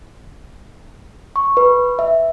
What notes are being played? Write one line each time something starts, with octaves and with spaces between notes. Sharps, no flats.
C#6
B4
E5